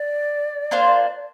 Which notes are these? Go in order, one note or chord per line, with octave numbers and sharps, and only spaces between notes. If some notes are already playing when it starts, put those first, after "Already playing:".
Already playing: D5
A#3 D4 F4 C5